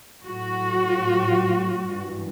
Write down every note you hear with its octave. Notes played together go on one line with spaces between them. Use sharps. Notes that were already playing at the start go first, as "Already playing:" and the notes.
A2 F#3 F#4
G2 E3 G3